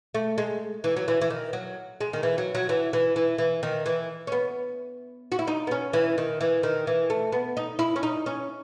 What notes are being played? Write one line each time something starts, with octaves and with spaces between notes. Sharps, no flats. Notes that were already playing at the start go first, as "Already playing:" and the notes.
A3
G#3
E3
F#3
E3
E3
D#3
F#3
G#3
D#3
E3
F#3
F#3
E3
E3
E3
E3
D#3
E3
C#4
B3
F#4
E4
D#4
B3
C#4
E3
D#3
E3
D#3
E3
A3
B3
D#4
E4
C#4
D#4
C#4